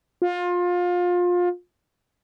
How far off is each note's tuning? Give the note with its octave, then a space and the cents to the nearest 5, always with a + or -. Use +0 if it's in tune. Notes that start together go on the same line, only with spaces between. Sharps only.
F4 +25